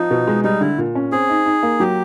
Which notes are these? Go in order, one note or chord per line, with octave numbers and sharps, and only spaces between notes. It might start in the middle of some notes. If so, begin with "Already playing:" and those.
Already playing: F3 D#4
B2
G#3
G3 D#4
D3 E4
A#2
C#4
C4 G#4
D#4
D#4
A#3
F#3 G4